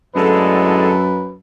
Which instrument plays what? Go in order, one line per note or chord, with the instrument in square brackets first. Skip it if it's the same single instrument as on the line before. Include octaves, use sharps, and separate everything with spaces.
[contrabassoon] F#2 [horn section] A2 D3 G#3 [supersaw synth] A4 [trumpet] B4